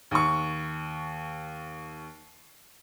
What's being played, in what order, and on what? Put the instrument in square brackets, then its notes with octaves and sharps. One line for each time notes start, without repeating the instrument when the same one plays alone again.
[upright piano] D#2 C#6